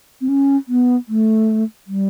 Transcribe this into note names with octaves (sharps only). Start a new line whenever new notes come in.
C4
C#4
B3
A3
G3